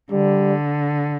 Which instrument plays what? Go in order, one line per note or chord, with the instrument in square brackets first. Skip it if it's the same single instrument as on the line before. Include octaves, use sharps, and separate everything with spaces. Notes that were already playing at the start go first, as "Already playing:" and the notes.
[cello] D3 [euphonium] G3